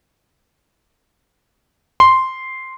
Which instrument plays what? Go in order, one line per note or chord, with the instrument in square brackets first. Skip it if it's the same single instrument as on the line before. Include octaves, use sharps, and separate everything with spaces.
[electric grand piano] C6